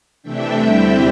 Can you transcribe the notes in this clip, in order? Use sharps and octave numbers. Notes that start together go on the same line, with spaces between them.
C3 E3 A3 D4 E5 G5
E2 D3 G3 C4 E4